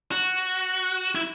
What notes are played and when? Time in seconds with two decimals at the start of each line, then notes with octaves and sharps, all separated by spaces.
0.12 F#4
1.15 E4